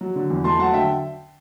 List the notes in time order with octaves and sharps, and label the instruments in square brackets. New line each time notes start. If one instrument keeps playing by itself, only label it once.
[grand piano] F#3
D3
E2
A3 A5 C6
F#3 F#5 A5
D3 E5 G5